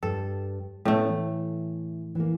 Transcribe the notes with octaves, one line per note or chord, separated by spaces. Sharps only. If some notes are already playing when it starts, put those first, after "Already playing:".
G2 A4
A2 A3 B3 C#4
E3
E3 A#3